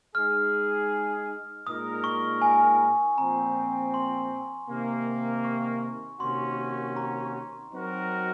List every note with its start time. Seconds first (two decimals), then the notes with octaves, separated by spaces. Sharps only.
0.15 G#3 D#4 G#4 F6
1.67 A#2 G#3 D#4 A#4 D#6
2.04 C#6
2.42 G#5
3.18 A#2 F3 C4 A#5
3.94 C6
4.69 C3 D#3 A#3
5.45 C#6
6.20 C3 D#3 A#3 C#4 F#4 C6
6.97 A#5
7.71 F#3 C4 D#4 F#4 A#4